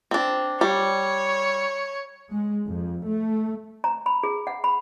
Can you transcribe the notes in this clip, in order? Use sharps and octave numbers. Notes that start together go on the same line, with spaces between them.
C4 D4
G3 C#5
G#3
F2
A3
A#5
B5
G#4
F#5
B5